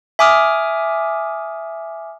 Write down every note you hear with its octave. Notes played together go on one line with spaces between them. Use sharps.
E5 G#5 D6 D#6 F6